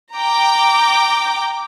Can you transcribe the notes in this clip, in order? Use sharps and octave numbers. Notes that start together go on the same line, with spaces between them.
G5 A#5 D6